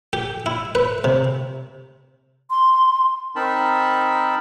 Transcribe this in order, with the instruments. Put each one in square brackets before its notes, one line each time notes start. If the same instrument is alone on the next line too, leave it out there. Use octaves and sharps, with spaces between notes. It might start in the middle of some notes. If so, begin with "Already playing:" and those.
[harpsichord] G4
E4
B4
C3
[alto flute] C6
[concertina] C4 D#4 A#4 A5 B5